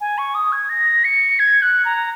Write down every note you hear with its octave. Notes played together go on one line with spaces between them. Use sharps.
G#5
C#6
D#6
G#6
A#6
C#7
G#6
F#6
A#5